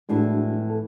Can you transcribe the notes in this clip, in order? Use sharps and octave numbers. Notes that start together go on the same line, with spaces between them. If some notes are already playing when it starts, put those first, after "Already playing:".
F2 A2 E3 G#3 D4 F#4
A4